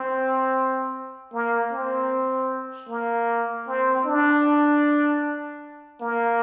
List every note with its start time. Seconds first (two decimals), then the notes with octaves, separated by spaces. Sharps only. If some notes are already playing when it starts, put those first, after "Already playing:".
Already playing: C4
1.34 A#3
1.72 C4
2.89 A#3
3.68 C4
4.06 D4
6.01 A#3